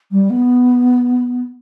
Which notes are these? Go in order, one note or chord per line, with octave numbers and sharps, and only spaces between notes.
G3
B3